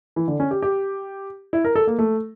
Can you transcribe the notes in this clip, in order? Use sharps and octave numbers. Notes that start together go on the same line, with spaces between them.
E3
D3
C#4
G4
G4
E4
A#4
A4
A#3
A3